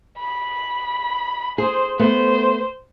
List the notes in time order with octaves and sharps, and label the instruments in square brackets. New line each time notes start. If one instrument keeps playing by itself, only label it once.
[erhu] B5
[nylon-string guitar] G#4 [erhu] C5
[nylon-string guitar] A3 B3 [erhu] C5